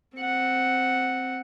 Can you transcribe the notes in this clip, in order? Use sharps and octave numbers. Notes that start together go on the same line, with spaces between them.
C4 F#5